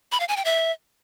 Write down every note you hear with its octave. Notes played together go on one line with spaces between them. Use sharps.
B5
F5
G#5
G5
E5